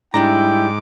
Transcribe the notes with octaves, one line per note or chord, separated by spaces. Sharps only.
G#2 G3 D4 E4 G5 A#5 D6